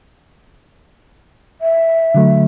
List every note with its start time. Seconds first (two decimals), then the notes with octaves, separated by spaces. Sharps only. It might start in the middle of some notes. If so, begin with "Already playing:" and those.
1.61 E5
2.14 D3 F#3 A3